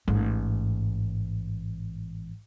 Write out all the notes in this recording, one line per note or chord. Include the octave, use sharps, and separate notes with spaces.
A1 G#2